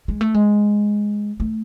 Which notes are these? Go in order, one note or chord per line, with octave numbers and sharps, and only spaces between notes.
G#3
A3
G#3
A3